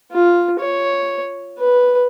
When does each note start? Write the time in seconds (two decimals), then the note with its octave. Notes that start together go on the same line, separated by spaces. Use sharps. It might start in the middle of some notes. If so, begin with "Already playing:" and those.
0.12 F4
0.59 C#5
1.58 B4